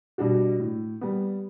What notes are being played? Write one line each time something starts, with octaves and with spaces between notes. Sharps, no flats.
B2 G3 D4 F#4
A2
G3 B3